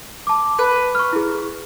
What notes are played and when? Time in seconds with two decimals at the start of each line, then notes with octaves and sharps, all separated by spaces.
0.27 A5 D6
0.59 B4
0.95 C#6 F6
1.13 E4 G#4